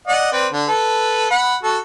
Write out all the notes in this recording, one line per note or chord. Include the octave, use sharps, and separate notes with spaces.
D5 D#5 F#5
C4 B4 D5
D3
A4 B4
F#5 B5
F#4 A4